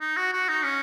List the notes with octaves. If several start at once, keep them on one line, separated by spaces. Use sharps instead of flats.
D#4
F#4
F#4
D#4
C#4